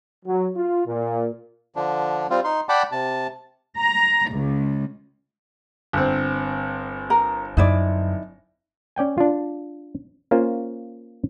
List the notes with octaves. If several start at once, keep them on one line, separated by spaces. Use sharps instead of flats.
F#3
F4
A#2
D3 F3 D4
G3 C4 F4
D#4 C6
D5 F#5 G5 A5 B5 D6
C3 A5
A#5
C#2
G1 C4
A#4
F#2 D#4 E4 D5
C#4 D5 G5 G#5
D4 F4
A#3 C#4 F4 A#4 C5